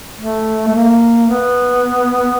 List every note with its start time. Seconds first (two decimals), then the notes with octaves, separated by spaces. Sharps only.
0.19 A3
0.68 A3
0.75 A#3
1.29 B3